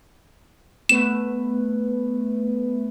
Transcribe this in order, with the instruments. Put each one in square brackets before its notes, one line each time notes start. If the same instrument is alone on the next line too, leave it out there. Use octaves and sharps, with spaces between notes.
[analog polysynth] A3 B3 B4 [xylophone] E7